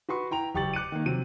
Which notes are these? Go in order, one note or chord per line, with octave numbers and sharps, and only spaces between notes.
F#4 B4 C6 C#6
E4 G5 A#5 F7
F#1 G4 C#6 A6 F#7
D6 F#6 C#7 D#7
D#3 A#3
C3 F3 F#3 D#7